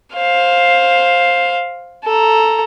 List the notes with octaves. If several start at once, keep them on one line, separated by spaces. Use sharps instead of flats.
C5 F5
A4 A#5